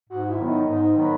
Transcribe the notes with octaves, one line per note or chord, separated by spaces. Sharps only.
G#2 F#4
E4
D#3 F#3 B3
D#4
G#2 D#4
D#3 F#3 B3